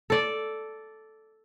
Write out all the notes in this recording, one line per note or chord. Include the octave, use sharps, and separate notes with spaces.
A4 D5